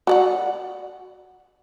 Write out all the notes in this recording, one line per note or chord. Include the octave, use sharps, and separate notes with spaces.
F#4 D5 F#5